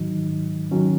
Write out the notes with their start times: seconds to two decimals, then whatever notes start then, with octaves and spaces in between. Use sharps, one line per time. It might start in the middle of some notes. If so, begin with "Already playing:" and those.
Already playing: G#2 D#3 F#3 D#4
0.71 D#3 F#3 C#4